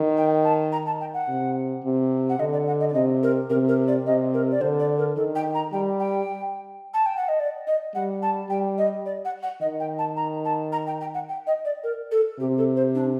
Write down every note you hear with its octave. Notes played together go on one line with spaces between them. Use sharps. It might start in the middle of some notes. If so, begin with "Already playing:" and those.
Already playing: D#3
G5
A5
A#5
A5
G5
F#5
C3
C3
F#5
D3 D#5
D5
F#5
D#5
D5
C3 D#5
A#4
C3 A#4
A#4
D5
C3 D#5
A#4
D5
D3 C5
D5
A#4
D#3 A4
G5
A#5
G3 G5
G5
A5
G5
F#5
D#5
D5
D#5
G3 F#5
A5
G3 G5
D#5
D5
F#5
F#5
D#3 D#5
G5
A5
A#5
A5
A#5
G5
G5
F#5
G5
D#5
D5
A#4
A4
C3 G4
A4
C5
D4